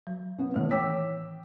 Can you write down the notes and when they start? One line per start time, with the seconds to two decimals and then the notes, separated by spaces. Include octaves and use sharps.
0.07 F#3
0.38 B3 C#4
0.54 A2 D#3 E3 B3
0.71 C#5 G5 D6 E6 B6